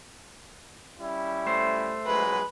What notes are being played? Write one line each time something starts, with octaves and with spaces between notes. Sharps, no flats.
G3 C#4 E4
A3 C5
A#1 F#3 G#3 B4